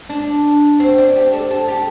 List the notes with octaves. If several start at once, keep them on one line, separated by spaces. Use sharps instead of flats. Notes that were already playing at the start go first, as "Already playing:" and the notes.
D4
C4
D4
G4
A4
A4
G4